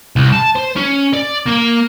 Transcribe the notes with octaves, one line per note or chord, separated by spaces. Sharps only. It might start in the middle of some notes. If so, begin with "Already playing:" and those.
C2
A5
C5
C#4
D5
A#3